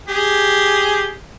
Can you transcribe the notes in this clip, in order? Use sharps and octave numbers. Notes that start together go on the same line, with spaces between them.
G4 G#4